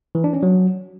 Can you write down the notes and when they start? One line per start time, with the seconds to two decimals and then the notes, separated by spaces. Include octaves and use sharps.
0.15 E3
0.24 D4
0.33 C#4
0.43 F#3